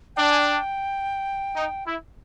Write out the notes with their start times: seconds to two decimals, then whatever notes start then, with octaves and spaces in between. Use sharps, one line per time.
0.16 D4 G5
0.31 G#5
0.39 G5
1.54 D#4
1.84 E4